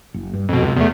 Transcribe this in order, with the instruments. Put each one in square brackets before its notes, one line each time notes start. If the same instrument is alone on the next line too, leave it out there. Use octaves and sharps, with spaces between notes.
[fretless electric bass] F#1
G2
[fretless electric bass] G#1 [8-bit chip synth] F2 B2
[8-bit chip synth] C#2 [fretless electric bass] F#2 C3
[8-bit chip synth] E2 A3